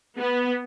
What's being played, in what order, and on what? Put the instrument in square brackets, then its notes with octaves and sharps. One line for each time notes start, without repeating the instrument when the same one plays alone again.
[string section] B3